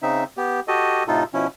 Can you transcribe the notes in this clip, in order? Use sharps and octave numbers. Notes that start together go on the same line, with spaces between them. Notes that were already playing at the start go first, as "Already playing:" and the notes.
C#3 C4 D#4 E5
B3 G4
F#4 G4 A4 D#5
A2 C3 D#4 F4 A4
B2 F3 C#4 E4